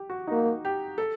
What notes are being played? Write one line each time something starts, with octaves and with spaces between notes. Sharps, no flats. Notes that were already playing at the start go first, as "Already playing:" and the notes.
Already playing: G4
F#4
D#4
A#3 F#4
G4
A4